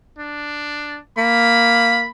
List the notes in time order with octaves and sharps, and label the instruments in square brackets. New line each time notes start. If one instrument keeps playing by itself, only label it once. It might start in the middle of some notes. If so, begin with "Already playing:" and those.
[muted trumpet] D4
[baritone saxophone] A#3 [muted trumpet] B5